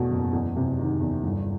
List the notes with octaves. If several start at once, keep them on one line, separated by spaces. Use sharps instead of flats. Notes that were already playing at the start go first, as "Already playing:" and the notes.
Already playing: E2 B2 A3
F#1
E2
C3
D#3
E2
G1